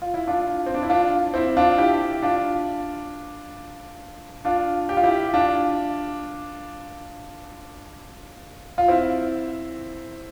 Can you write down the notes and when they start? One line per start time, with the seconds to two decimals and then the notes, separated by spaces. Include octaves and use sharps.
0.02 F4
0.14 E4
0.27 D4 F4
0.66 C4
0.74 D4
0.83 E4
0.90 D4 F4
1.34 C4 E4
1.57 D4 F4
1.78 E4 G4
2.22 D4 F4
4.45 D4 F4
4.89 G4
4.97 F4
5.04 E4 G4
5.34 D4 F4
8.78 F4
8.88 C4 E4